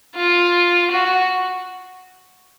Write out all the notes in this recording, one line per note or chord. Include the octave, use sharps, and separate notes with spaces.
F4
F#4